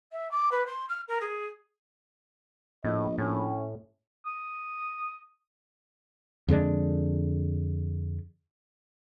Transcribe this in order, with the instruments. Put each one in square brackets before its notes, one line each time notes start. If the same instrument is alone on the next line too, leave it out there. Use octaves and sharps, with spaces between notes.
[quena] E5
D6
B4
C6
F6
A#4
G#4
[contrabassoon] A#1 [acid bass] A2 [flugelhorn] D#5
[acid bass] A2 [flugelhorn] C#4
[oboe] D#6
[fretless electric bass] F2 D3 G#3 D4